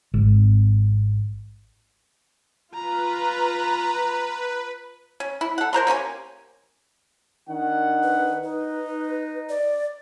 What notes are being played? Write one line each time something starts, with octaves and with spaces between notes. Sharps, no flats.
G#1
F4 B4 A#5
C#4
E4
A4 F#5
A#4 C5 A#5 C6
A#3 C#4 G4 G#5
D#3 D4 F#5
B4
D#4 B4
D5